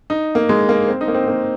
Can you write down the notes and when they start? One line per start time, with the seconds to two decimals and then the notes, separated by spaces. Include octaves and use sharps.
0.10 D#4
0.35 A#3
0.49 G#3
0.69 A#3
0.88 C4
1.01 D#4
1.08 A#3
1.15 C4
1.28 A#3